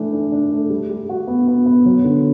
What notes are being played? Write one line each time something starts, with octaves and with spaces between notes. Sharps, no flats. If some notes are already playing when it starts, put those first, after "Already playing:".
Already playing: E3 A3 D4
D4
D4
A3
G3
G3
F#4
B3
B3
B3
F#3
D3